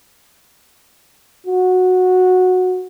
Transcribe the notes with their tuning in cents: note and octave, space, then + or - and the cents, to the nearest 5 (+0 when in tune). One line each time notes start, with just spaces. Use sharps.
F#4 -10